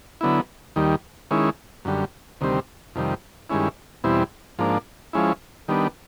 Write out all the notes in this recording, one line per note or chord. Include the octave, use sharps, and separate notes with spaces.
D3 F#3 B3 E4
D#2 D#3 G3
D#3 G#3 C#4 E4
F#2 D3 G3
D2 C3 D#3 G3 C4
F2 C3 D#3 G3
G2 D#3 G#3 C#4 E4
E2 B2 G3 C4 E4
G#2 F3 A#3 D4
F3 G#3 C#4 E4
D#3 G3 B3 D4